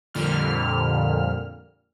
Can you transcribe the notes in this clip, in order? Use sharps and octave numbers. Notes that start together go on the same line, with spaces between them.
F2 A#2 D3 G3 F6